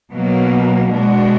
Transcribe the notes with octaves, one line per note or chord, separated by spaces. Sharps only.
B2 F#3 A#3
B2 G#3 D4 F#4